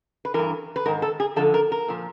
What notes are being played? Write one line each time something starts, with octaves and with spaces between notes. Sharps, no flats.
B4
G2 E3 A#4
B4
G#2 D#3 A#4
A4
G#4
F#2 D3 F3 A4
A#4
A#4
A#2 F3